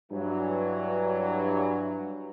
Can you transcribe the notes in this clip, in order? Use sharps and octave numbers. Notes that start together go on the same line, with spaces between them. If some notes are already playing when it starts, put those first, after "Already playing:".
G2 E3 F#3